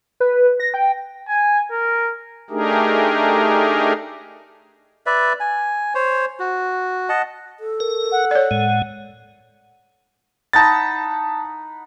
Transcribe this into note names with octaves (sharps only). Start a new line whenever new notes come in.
B4
A#6
G5
G#5
A#4
A3 D4 D#4 G4 G#4 A#4
B4 D5 E5
G#5
C5 C#5
F#4
D#5 F#5 A5
A4
A#4
F#5
C#5 D5
A2 G#3
D#4 F#5 A5 B5 A6